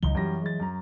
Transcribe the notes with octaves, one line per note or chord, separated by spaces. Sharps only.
C#2 E3 F#3 D#4 G7
F#2 E3 F#3 G3 A#6
G#3 A6
F#2 A#5